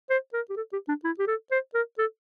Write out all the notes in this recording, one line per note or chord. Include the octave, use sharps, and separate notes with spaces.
C5
A#4
G4
A4
G4
D4
E4
G4
A4
C5
A#4
A4